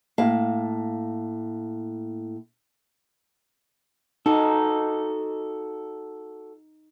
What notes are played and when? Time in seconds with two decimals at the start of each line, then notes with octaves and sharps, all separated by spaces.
0.18 A2 A#3 F5 A5
4.26 D#4 F#4 A4